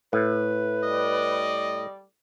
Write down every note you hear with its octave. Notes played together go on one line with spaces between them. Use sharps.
A2 B4
G3 D5 D#5